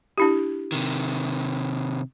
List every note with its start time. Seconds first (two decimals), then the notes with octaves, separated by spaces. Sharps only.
0.18 D4 E4 G4
0.72 C3 D#3